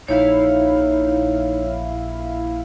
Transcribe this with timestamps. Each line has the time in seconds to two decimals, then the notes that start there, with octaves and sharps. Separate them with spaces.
0.08 A#1 D#4 E4 C#5 F5